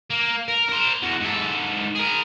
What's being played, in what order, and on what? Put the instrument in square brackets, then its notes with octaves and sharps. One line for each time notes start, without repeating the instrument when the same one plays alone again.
[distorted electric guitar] A#3
A#4
A#4 C5
E2 F#4
G#2 A4
G#4 A#4